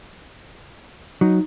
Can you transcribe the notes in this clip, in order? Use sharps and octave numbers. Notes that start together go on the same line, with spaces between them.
F#3 D#4